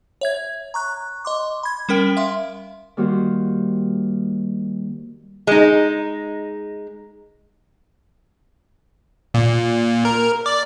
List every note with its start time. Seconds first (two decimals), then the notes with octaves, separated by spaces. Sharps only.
0.21 C#5 E5 G#6
0.74 A#5 C#6 F#6
1.25 D#5 C6 D6
1.63 B5 G#6
1.89 G3 C#4 A#4 G5 D7 G7
2.17 E5 F5 C6
2.97 D#3 G3 A#3 F#4 C5
5.47 G#3 D#4
9.34 A#2
10.05 A#4
10.46 D5